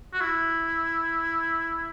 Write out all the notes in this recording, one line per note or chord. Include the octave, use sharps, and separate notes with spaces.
F#4
E4